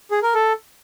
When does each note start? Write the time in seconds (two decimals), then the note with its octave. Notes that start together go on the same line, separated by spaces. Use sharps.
0.11 G#4
0.23 A#4
0.34 A4